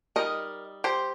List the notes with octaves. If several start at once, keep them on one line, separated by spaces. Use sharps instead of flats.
G3 D#4 A#4 D#5
G4 C5